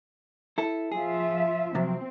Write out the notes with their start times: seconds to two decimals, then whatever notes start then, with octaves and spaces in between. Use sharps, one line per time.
0.58 E4 A4
0.92 F3 F4 G#4 E5
1.75 C3 F3 F#3 C4